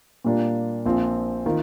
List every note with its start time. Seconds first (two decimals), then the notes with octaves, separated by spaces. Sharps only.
0.24 A#2 G3 A#3 D4 F4
0.86 A#1 A#2 F3 C4 F4
1.46 D#3 A#3 F4